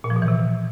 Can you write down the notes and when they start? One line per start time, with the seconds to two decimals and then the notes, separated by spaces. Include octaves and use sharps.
0.04 A#2
0.10 F3
0.16 B2
0.22 E3
0.28 C3